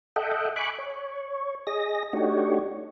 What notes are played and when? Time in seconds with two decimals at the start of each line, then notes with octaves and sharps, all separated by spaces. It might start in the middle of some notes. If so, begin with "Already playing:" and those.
0.16 A4 D#5 E5 F#5 G5
0.56 G#5 B5 C#6 D6 F#6
0.78 C#5
1.67 G#4 D#5 A#6
2.13 A3 D4 D#4 F#4 G4 C#5